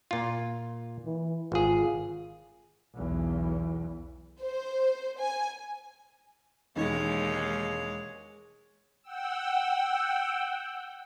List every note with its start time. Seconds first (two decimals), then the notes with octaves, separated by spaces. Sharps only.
0.11 A#2 F4
1.06 E3
1.52 G#1 F4 G#4
2.94 B1 E2
4.42 C5
5.20 G#5
6.76 E1 D#2 G#3 D#4 C#5
9.02 F#5 G5 E6